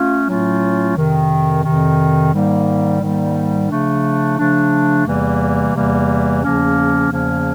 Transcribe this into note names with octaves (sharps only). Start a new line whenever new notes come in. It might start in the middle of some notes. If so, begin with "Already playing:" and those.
Already playing: A3 C#4 F4
A2 F#3 A3 C#4 F4
F2 C3 D#3
F2 C3 D#3
G#2 D#3 G3 A#3
G#2 D#3 G3 A#3
C#3 F3 A3 D4
C#3 F3 A3 D4
E2 C3 E3 G3 A#3
E2 C3 E3 G3 A#3
E2 C#3 F3 A#3 C#4
E2 C#3 F3 A#3 C#4